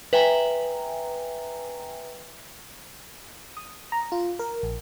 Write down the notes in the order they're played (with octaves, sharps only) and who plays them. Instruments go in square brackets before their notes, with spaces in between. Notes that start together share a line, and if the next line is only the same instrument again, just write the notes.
[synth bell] B4 E5 G5 G#5 A#5
[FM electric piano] D#6
A#5
F4
A#4
A#1